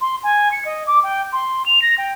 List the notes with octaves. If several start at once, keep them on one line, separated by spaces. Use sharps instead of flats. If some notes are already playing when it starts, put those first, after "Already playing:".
C6
G#5
C#7
D#5
D6
G5
C6
F7
A#6
G5